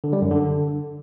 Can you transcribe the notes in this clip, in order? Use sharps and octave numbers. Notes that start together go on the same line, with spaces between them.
D3
G3
F#2
D3